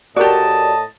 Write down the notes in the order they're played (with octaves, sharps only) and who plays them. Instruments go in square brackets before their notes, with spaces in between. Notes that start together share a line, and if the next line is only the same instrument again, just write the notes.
[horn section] A2 D#5 A5 [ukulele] F#4 G4 [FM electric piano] A#4 D5